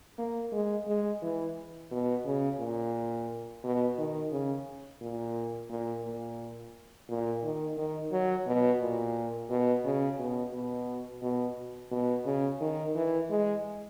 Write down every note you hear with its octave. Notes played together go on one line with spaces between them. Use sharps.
A#3
G#3
G#3
E3
B2
C#3
A#2
B2
D#3
C#3
A#2
A#2
A#2
A#2
D#3
D#3
F#3
B2
A#2
B2
C#3
B2
B2
B2
B2
C#3
D#3
E3
G#3